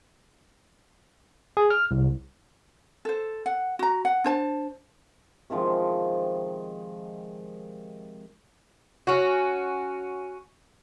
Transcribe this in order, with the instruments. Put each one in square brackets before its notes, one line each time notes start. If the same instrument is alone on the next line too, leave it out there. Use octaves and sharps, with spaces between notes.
[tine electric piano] G#4
F6
C2
[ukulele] A4 C5
F#5
F#4 A#5
F#5
D4 C5 A5
[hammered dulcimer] C3 D#3 F3 G#3
[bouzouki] C#4 F#4